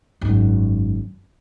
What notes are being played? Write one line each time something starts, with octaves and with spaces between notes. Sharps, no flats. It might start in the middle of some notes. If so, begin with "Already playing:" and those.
G#1 F#2